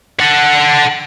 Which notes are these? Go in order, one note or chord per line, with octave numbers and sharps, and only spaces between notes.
A4 F#5